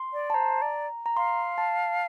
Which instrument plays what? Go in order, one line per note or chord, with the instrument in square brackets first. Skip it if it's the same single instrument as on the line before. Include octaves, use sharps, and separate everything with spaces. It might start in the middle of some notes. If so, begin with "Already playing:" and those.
Already playing: [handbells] C6
[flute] D5
[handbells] A5
[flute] C5 [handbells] A#5
[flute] D5
[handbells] A#5
[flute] F5 [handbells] C6
[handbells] A5